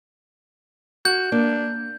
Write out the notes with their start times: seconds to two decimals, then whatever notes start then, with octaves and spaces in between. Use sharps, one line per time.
1.05 F#4 G6
1.32 A#3 D4